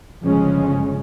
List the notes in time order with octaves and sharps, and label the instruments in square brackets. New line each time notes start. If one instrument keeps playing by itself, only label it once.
[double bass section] G1 C#3 F3 G#3 C#4